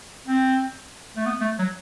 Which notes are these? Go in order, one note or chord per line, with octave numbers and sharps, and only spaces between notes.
C4
A3
B3
A3
F#3